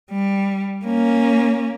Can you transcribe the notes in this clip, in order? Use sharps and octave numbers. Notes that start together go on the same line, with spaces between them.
G3
A#3 C#4